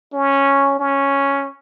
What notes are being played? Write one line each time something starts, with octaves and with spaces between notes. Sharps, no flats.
C#4
C#4